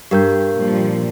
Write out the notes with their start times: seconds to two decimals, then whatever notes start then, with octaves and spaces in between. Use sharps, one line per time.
0.11 G2 G4 A#4 G6
0.55 A#2 F3 G3